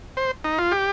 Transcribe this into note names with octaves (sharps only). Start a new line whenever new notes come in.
C5
D#4
F4
G4